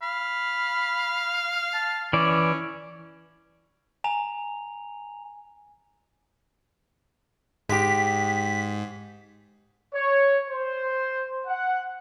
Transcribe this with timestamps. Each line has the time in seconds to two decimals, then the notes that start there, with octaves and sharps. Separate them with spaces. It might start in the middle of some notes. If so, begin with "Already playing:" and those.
0.02 F5 B5
1.73 A5
2.13 E3 C#4 D5
4.04 G#5 A#5 F7
7.69 G#2 G#3 G4 B6
9.93 C#5
10.49 C5
11.46 F#5